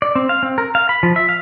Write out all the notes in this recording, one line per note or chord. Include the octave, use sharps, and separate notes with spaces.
D5
C4
F5
C4
A#4
F5
B5
F3
E5
F5